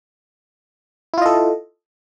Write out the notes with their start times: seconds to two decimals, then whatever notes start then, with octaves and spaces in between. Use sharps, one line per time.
1.14 E4
1.18 F4
1.22 D#5
1.26 A4